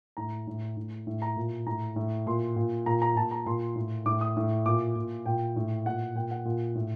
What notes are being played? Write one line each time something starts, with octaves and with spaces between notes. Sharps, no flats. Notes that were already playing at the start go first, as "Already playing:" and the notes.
A2 A#5
A2
A2
A2
A#5
A#2
A2 A#5
A2
A#2 C6
A#2
A#2 A#5
A#5
A#2 A5
A#5
A#2 C6
A2
A2 D6
D#6
A2
A#2 D6
A#2
A#2 G5
A2
A#2 F#5
A#2 G5
F#5
A#2
A2